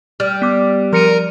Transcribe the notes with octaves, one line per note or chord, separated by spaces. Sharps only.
G3 F6
B3 D6
F3 A#4 C#7 D#7